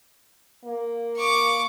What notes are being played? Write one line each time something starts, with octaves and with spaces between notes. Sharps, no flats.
A#3
C#6 D6